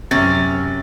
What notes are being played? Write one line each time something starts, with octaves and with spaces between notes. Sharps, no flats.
F#2 C3 F#3 C#4 A6